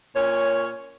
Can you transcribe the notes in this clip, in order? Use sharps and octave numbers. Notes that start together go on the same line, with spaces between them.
A#2 C#4 C#5